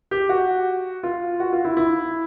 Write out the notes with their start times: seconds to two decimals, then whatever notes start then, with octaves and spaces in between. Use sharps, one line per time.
0.11 G4
0.29 F#4
1.03 F4
1.40 F#4
1.53 F4
1.65 E4
1.77 E4